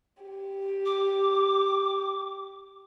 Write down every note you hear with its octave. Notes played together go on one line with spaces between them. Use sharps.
G4
D6